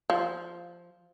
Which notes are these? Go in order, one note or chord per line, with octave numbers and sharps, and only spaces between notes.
F3